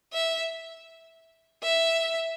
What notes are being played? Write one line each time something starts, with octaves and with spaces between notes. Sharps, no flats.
E5
E5